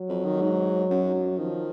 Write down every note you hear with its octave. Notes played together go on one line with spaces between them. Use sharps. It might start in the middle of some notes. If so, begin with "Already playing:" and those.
Already playing: F#3
F2
D#3
G#2
F#2
F#2
D#3 F3